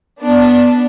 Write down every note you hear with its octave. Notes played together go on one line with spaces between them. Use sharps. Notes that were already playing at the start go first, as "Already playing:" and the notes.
B3 D4